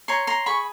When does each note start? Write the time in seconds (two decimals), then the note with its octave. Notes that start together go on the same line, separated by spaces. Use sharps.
0.08 C#5 A#5 C6
0.27 A#5 C6
0.46 G#4 B5 C#6